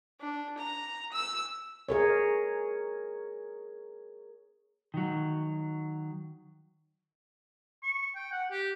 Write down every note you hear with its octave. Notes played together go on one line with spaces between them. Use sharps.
D4
A#5
E6
G#4 A#4 C#5
D#3 F#3
C#6
G5
F#5
G4